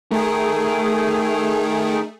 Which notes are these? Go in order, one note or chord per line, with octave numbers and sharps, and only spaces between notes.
A3 D#4 G#4 A#4